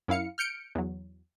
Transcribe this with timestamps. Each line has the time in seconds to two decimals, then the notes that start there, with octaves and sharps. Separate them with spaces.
0.08 F#2 E4 F5 C#7
0.38 F6 G6 C#7 D7
0.75 E2 F#3